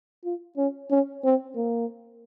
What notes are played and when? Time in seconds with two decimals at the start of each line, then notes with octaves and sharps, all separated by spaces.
0.25 F4
0.57 C#4
0.91 C#4
1.24 C4
1.56 A#3